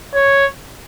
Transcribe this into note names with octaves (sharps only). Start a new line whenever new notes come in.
C#5